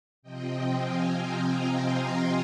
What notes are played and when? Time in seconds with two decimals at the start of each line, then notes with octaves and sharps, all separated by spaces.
0.23 C3 F3 C4 D#5 G5
0.71 F5 G#5
1.19 G5 A#5
1.68 G#5 C6